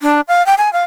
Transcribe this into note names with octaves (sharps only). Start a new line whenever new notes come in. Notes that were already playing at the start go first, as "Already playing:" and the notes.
D4
F5
G5
G#5
F5